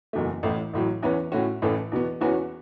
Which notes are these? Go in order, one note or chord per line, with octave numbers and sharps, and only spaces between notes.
F#1 E2 B2 A3
A1 A2 A3
A1 A2 F#3
E2 E3 C#4 E4 B4
A2 A3 C#4 F#4
A1 A2 E3 C#4 A4
E2 B2 B3
E2 E3 C#4 F#4 B4